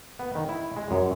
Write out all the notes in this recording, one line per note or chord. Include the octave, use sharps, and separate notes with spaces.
B3
D#3
E4
G#3
F#2